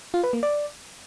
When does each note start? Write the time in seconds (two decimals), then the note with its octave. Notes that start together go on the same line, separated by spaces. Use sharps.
0.14 F4
0.23 B4
0.33 A#3
0.43 D5